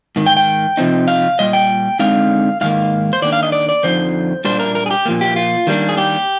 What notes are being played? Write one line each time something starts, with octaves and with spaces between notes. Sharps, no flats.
G#2 D#3
G5
G5
C3 F3 C4 D#4
F5
A#2 G3 D#5
G5
D3 G#3 C4 D#4 F5
G#2 D#3 A#3 F5
C5
D#3 A#3 D4 D5
F5
D#5
D5
D5
F2 D3 F3 D#4 C5
A#2 G3 A#3 D4 C5
A#4
A#4
G#4
G4
A#2 F3 A#3
G4
F4
D#3 G3 A#3 D4
G#4
G4